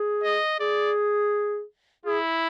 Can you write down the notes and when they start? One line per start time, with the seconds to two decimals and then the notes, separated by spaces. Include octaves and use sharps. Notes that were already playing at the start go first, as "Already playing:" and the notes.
Already playing: G#4
0.24 D#5
0.60 G#4 D5
2.05 E4 G#4